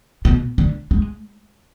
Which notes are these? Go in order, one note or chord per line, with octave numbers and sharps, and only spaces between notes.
B2
D3
G#3